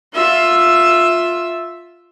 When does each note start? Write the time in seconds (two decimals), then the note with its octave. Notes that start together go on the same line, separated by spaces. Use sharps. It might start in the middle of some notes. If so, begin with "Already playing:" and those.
0.15 F4 E5